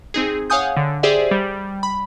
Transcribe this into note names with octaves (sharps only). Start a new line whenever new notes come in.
C4 D#4 G#4
C#5 F5 F#5 G#5 D#6 G6
D3
G4 G#4 C5 D5 E5
G3
B5